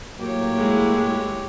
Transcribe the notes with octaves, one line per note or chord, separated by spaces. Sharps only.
A2 F#3 A#3 G4 C#5
G#3 E4